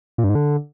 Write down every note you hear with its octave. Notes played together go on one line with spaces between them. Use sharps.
A#2
G2
G#2
D3